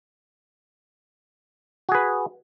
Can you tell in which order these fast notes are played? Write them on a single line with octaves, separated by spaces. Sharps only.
F#4 G#4 B4